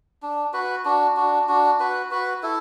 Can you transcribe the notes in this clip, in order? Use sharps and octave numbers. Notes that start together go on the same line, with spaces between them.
D4
F#4 B4
D4 F#4
D4 F#4
D4 F#4
F#4 B4
F#4 B4
E4 A4